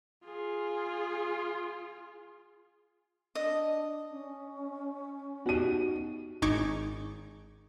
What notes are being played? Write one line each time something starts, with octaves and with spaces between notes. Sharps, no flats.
F4 G#4
D4 D#5
C#4
B3 D#4 F#4 G4 D#7
G#1 D#4 C#6 D6 G#6